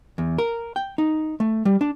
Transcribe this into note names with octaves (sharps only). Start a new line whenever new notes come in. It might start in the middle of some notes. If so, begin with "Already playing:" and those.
E2
A#4
G5
D#4
A3
G3
D4